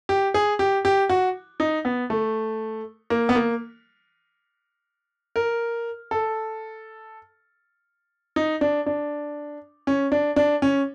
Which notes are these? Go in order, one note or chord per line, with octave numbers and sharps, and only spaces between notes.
G4
G#4
G4
G4
F#4
D#4
B3
A3
A#3
B3
A#3
A#4
A4
D#4
D4
D4
C#4
D4
D4
C#4